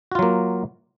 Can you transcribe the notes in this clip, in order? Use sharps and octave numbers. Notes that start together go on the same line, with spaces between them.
F#3 A#3 F4 F#4